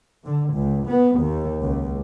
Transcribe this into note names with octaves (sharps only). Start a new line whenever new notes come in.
D3
C#2
B3
D#2
C#2